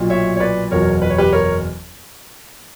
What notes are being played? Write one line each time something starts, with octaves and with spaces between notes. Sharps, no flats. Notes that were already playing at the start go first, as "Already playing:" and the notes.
Already playing: B1 A#2 F#3
C#5 E5
C#5
B4 D5
F#1 E2 B2 F#3 A#4 C#5
B4
C#5
G4 B4
A#4 C#5